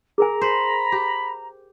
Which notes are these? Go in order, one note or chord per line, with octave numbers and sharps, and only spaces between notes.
G#4 A#4 G#5 A#5
C5 B5
G4